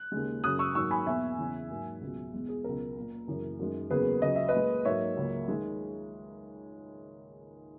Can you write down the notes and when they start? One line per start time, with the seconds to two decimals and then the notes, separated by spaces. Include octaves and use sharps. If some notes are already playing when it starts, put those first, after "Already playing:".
Already playing: F#6
0.12 D#2 C#3 G#3
0.44 F#2 C#3 F#3 D#6 F#6
0.59 C#6 E6
0.75 G#2 D#3 F#3 A#3 C#6 E6
0.91 G#5 B5
1.07 E2 B2 A#3 E5 G#5
1.38 E2 C#3 E3
1.70 G#2 F#3 A#3
2.01 C#2 B2 F#3
2.33 E2 B2 G#3
2.49 G#4
2.64 C#2 B2 F#3 A#4
2.96 A#2 A#3
3.28 F#2 C#3 E3 A#3
3.59 F#2 D#3 G#3
3.90 E2 C#3 F#3 A#3 G#4 B4
4.22 C#2 C#3 F#3 D#5
4.36 E5
4.48 B4 D#5
4.54 A#2 G#3
4.85 G#2 F#3 A#3 C#5 E5
5.17 C#2 C#3 F#3 A#3
5.48 D#3 G#3